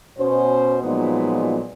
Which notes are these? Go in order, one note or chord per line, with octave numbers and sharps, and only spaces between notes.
B2 C#4 C5
A#2 F3 F#3 G#3 B3 D#4